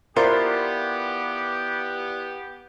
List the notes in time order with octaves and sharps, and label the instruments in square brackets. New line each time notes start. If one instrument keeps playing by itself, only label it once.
[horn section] B3 G4 [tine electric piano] E4 D5 C6 [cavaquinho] F4 [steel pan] A#4 C5